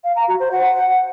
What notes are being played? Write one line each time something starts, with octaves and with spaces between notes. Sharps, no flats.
F5
A#5
F#4
C5
F#5